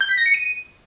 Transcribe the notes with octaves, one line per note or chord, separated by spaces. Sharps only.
G6
B6
A#6
C#7
D#7